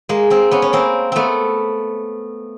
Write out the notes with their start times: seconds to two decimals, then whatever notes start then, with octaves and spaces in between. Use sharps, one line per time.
0.09 G#3 A#3
0.30 A#3 C4
0.51 B3 C#4
0.62 C#4
0.73 A#3 C4
1.12 A3 B3 C4